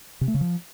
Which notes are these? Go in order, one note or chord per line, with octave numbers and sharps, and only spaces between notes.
C3
A3
C#3
F3